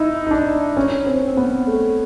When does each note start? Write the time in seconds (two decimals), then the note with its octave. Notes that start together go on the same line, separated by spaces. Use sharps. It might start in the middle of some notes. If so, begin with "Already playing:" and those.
Already playing: D#4 E4
0.27 D#4
0.31 D4
0.77 C#4
1.06 C4
1.27 C4
1.37 B3
1.67 A3